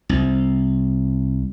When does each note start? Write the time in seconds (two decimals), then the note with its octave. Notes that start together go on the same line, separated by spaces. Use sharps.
0.09 C2